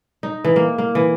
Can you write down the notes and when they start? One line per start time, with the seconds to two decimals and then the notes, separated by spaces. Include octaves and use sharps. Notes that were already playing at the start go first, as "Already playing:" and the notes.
0.23 D#4
0.45 E3
0.56 A#3
0.78 A#3
0.95 E3